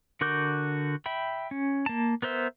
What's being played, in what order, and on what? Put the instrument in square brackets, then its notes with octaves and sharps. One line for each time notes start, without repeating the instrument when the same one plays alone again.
[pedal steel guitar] D3 F#4 A#4 D6 G6
E5 G5 B5
C#4
A#3 A5
B3 A#4 C5 E5